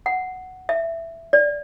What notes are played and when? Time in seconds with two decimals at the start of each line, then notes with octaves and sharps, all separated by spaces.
0.06 F#5
0.69 E5
1.33 D5